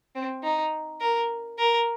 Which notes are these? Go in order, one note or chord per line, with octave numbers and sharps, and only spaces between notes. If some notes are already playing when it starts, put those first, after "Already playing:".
C4
D#4
A#4
A#4